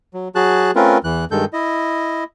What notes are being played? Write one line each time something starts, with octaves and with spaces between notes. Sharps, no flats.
F#3
F#3 F#4 G#4 A5 F#6
A3 C4 C#4 F4 A#4 B4
E2 E3 F#6
G2 D#3 G#3 A4 G6
E4 D#5